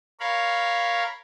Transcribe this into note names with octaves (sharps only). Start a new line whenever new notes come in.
A#4 C#5 F5 B5